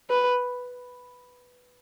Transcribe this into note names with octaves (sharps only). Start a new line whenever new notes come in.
B4